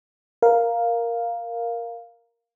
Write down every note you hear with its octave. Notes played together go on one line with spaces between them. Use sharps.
A#4 F5